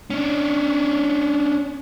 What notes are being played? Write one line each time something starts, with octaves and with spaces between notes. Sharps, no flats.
C#4 D4